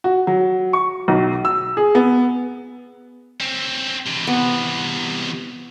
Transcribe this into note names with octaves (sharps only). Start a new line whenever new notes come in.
F#4
F#3
C#6
B1
E6
G#4
B3
C4 C#4
C3 E3
B3